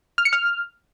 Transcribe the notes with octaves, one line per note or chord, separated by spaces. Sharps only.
F6
C#7
F6